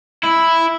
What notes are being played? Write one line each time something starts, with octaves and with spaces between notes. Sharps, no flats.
E4